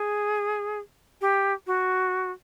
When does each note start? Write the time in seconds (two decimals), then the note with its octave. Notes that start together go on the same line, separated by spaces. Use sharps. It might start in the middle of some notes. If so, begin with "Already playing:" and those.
Already playing: G#4
1.21 G4
1.67 F#4